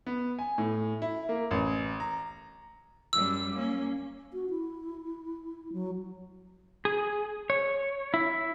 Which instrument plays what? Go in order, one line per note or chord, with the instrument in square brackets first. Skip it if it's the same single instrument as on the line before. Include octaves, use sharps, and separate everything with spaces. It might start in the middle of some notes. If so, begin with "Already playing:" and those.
[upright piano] B3
G#5
A2
E4
A#3
A1
A#5
[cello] F#2 G3 [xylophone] E6
[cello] A#3 C#4
[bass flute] F#4
E4
F#3
[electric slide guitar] G#4
C#5
E4